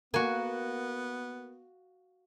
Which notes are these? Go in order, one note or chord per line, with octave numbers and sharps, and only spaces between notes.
A#3 B3 F#4 G#5